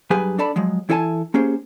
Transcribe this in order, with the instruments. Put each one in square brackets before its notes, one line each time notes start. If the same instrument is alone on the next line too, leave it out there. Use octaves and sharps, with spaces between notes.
[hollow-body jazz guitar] G2 F#3 G4 G#4 B4 G#5
D4 A4 D5 A5 B5
F3 F#3 G#3
E3 E4 A4 C#5 G#5 A5
A#3 C#4 G4 G#4 C5